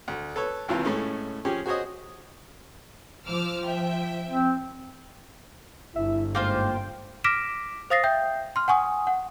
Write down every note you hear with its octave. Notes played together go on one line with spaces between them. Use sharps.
D2
A4 B4 C#5
G#1 D#2 C3 E3 F4
A2 G#3 A3 C#4
F3 C#4 G4 G#4
F#4 G#4 C5 C#5 D#5 D#6
F3 D6 E6 F6
E5 G5
C4
G1 E4 E5
G#2 A#3 F4 C5 G5
D6 F6 A#6 B6 D7 E7
C5 F5 D#6 A6 A#6 C7
E5 G5 G6
C6 F6
F#5 G#5 C#6 D#6
F#5